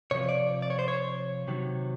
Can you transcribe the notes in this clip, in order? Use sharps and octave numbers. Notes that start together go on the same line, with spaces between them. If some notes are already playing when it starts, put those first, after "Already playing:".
C3 F3 C#5
D5
D5
C#5
C5
C#5
C3 D#3 F#3